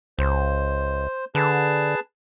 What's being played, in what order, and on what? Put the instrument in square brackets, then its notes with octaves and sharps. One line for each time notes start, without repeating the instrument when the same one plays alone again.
[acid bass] C#2 [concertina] C5
[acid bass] D3 [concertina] G#4 B4 A5